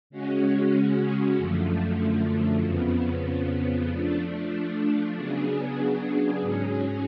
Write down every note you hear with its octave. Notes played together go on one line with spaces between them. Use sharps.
C#3 G#3 C#4 F#4
F#2 D3 F3 A3
F2 C#3 F3 B3
F3 A3 D4
C#3 F#3 B3 D4 G#4
G#2 F#3 C#4 G#4